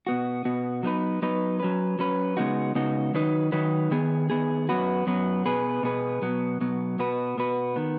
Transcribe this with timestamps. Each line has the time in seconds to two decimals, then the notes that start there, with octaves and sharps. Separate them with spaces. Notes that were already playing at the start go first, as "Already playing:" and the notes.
0.07 B2 B3 F#4
0.45 B2 B3 F#4
0.83 F#3 B3 D#4 B4
1.22 F#3 B3 D#4 B4
1.60 F#3 C#4 B4
1.99 F#3 C#4 B4
2.37 C#3 G#3 B3 D#4 F#4
2.75 C#3 G#3 B3 D#4 F#4
3.14 D#3 F#3 D#4 B4
3.52 D#3 F#3 D#4 B4
3.91 D#3 B3 G#4
4.30 D#3 B3 G#4
4.69 F#2 F#3 B3 F#4 B4
5.06 F#2 F#3 B3 F#4 B4
5.46 B2 B3 G#4 B4
5.83 B2 B3 G#4 B4
6.22 B2 F#3 B3
6.61 B2 F#3 B3
6.99 B2 B3 F#4 B4
7.37 B2 B3 F#4 B4
7.76 D#3 B3